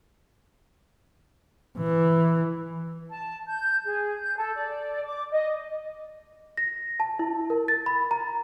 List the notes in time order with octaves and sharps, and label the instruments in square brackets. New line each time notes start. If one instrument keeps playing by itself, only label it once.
[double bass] E3
[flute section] A5
G6
G#4
G6
A4
D5
D6
D#5
[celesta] A#6
A5
E4
A#4
A6
B5
A#5